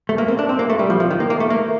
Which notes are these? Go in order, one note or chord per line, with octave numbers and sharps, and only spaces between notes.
A3
A#3
C4
D4
C4
A#3
A3
G3
F3
F3
D#3
A#3
A#3
A3
A#3